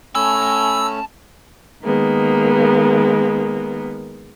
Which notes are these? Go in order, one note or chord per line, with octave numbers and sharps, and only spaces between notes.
A3 C#4 G#5 A5 B5 E6
D#3 G#3 A#3 B3